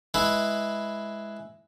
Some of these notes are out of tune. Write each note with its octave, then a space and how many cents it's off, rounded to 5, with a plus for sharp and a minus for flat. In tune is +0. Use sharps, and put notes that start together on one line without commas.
G#3 +0 E4 +0 B4 +0